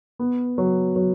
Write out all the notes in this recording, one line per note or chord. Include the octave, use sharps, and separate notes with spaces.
B3
F#3
F#3